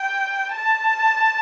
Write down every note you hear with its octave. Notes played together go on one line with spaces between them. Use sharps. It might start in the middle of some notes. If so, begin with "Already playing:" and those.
Already playing: G5
A5